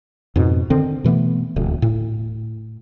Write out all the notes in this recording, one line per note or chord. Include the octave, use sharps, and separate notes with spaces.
F2 G#2 B2
D3 D#3 C4
B2 E3 A3 B3
D#1 D2
A2